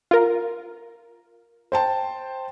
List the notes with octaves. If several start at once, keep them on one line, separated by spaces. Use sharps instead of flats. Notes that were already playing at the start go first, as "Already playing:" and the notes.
F4 A#4
C5 G5 A5